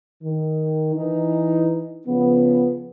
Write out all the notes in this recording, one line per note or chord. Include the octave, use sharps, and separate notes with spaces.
D#3
E3 D#4
C#3 F3 B3